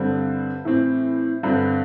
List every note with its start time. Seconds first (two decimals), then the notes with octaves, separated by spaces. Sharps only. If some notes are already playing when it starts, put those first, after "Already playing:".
Already playing: G2 D3 G3 C4
0.65 A2 E3 C4
1.43 G2 D3 C4